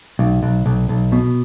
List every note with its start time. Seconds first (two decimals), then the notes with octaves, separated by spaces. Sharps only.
0.19 B1
0.43 B1
0.66 B1
0.89 B1
1.12 B2